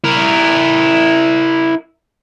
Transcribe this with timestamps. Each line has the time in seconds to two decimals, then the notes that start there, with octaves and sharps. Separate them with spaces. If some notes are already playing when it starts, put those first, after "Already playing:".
0.04 E4 A#4